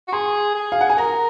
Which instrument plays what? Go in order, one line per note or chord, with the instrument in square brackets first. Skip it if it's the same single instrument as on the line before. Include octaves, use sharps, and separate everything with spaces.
[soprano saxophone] F#4
[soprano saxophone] G#4 [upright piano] C6
[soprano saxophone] G#4
[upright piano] F5
F#5
G#5
[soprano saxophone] A#4 [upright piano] A#5